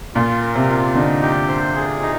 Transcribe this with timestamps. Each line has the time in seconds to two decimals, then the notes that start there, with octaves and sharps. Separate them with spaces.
0.15 A#2 F4
0.41 A#4
0.55 C3
0.69 F4
0.95 D3 D#4
1.22 G4
1.48 C5
1.75 G#4
2.02 D#4